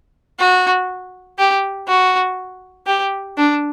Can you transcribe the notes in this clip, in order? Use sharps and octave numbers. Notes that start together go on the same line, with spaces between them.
F#4
G4
F#4
G4
D4